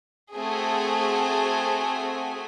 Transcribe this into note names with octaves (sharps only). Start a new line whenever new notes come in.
A3 C4 F#4 G#4 G#5